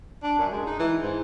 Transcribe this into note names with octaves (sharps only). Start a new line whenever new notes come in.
D4
F#2
G#3
D#4
E3
G#2